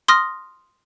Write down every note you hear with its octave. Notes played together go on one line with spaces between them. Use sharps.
C6 D#6 F6 A#6